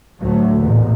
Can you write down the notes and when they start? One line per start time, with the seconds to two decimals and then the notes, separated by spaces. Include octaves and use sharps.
0.20 A1 D2 F#3 A3
0.57 A1 E2 A#2